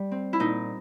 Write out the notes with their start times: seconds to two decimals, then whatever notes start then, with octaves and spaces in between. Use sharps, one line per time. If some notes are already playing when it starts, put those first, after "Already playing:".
Already playing: G3
0.11 C4
0.33 E4
0.40 A#2 D#4